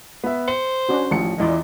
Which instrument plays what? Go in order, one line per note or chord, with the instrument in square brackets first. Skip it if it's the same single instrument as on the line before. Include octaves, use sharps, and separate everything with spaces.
[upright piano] B3 E5
[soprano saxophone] C5 [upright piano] C#7
[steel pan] C#4 D4 F#4
[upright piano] A1 F3 C#7
[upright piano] E2 E3 D#5 [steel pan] F4 D5